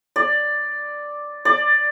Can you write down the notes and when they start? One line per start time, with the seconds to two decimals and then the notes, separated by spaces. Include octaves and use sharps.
0.16 D5
1.45 D5